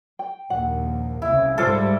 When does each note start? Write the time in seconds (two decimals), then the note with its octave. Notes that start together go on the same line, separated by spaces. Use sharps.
0.19 G5
0.50 A#1 D#2 F#5
1.22 C2 C#3 E4
1.58 G#2 G3 F4 A4 C5 D6